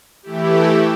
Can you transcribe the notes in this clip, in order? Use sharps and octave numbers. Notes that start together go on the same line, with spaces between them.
E3 A3 E4 G4